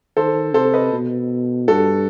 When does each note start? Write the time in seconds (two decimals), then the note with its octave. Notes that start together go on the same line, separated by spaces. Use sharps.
0.17 D#3 A4 C5
0.54 C3 A4 C5
0.74 B4 D#5
0.93 B2
1.68 G2 F#4 A4